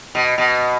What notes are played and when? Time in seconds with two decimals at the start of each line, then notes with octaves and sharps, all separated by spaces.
0.15 B2
0.38 B2